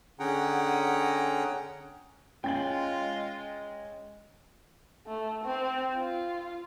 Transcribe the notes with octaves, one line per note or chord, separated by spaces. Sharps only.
D3 C#4 G#4 F#5 G5 A#5
G#3 C#4 F4 G5 A6 F#7
A3
C4
F4